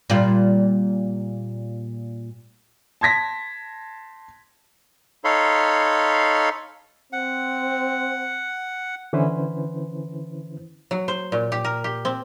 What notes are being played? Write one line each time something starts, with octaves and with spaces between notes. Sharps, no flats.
A#2 G3 F4
A5 C6 G#6 A#6 B6
D#4 A4 C#5 F5 B5 C6
C4 F#5
D3 E3 C#4 E4 B4 C5
F#3
C5
A#2
G4
A#4
G4
C4